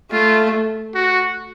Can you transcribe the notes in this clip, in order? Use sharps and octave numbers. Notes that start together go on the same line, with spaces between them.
A3 F4
F#4